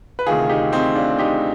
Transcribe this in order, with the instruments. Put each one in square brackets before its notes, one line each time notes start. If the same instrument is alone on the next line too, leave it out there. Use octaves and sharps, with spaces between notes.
[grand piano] B4
D2 C3 D#3 F4 G#4
D#4 G4
C4 D#4
D4 F4
D#4 G4